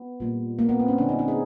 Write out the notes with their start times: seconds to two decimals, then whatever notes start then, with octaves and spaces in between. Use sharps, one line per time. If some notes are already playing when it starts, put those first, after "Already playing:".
Already playing: B3
0.20 A#2 G3 A#3
0.59 A#3
0.69 B3
0.79 C4
0.88 C#4
0.98 D3 G3 A#3 D4
1.09 D#4
1.19 D#4
1.28 G#4